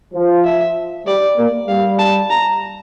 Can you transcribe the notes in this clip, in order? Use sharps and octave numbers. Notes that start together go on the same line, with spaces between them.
F3
E5
G3 D5
A#3
G3 F5
A5
A#5